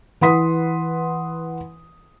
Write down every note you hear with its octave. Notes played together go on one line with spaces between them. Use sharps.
E3 B4 F#5 C6 D#6 B6